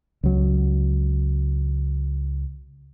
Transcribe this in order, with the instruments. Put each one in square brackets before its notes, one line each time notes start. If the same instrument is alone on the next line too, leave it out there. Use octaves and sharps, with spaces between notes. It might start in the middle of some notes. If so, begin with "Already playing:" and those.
[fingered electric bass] C#2 F#3